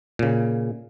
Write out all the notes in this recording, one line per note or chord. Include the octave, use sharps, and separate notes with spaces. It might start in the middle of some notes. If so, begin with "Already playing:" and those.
A#2 C#3